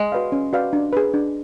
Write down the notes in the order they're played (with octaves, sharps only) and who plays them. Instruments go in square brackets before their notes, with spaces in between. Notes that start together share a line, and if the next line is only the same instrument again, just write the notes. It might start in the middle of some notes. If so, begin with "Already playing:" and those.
Already playing: [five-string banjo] G#3
[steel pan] F#4 B4 D5 F5
C#4
F#4 B4 D5 F5
D4
G#4 B4
D4